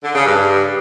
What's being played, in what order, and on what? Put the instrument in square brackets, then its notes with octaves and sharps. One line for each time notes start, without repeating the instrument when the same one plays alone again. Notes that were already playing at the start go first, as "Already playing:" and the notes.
[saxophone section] D3
C#3
G2